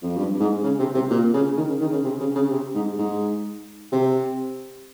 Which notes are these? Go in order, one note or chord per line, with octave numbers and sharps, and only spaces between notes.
F2
G2
G#2
C#3
C3
C3
A#2
C#3
D#3
C#3
D#3
C#3
C3
C#3
C#3
C3
G#2
G#2
C3